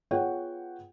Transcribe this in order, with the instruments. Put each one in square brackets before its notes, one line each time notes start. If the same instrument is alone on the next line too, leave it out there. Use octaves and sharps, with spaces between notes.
[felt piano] B3 F4 G#4 C#5 F#5 G5